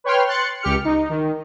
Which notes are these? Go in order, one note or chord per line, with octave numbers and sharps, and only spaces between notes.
B4 C#5 G5 C6 F6
C6 F#6 A6 C#7
C#2 G4 F6 C#7
D#4
D#3